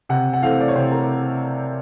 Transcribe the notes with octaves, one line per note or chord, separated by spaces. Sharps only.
C3 F#5
F#5
E3 A3 C4 F5
D5
C#5
C3 C5
A#4